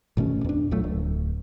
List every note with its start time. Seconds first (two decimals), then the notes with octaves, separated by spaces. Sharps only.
0.17 G#1 B2 A3 C#4
0.45 E2 D4
0.71 A#1 A#2 F#3 A3
0.84 D1